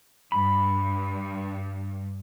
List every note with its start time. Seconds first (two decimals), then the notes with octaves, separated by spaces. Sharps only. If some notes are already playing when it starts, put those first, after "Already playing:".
0.32 G2 B5